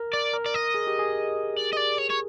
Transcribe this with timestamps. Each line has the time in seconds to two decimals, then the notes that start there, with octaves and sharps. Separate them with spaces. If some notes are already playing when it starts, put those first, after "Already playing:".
Already playing: A#4
0.13 D5
0.34 A#4
0.46 D5
0.54 D#5
0.75 G#4
0.87 G4
0.99 G#4
1.57 D5
1.73 D#5
1.77 D5
1.99 C#5
2.10 C#5